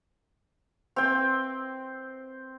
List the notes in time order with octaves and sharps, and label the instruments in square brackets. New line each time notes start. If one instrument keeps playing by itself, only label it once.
[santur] C4 G5